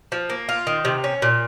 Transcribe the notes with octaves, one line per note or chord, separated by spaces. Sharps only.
F3
A#3
F4
D#3
C3
C#4
A#2